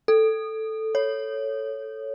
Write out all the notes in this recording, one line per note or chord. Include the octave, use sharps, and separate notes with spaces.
A4
C#5